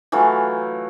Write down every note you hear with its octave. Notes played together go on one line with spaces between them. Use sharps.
E3 F#3 A3 F4